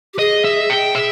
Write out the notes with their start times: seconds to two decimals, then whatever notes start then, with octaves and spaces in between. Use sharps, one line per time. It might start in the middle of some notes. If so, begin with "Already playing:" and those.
0.14 G4
0.19 G#4 D#5
0.44 E5
0.70 G5
0.95 G#4 E5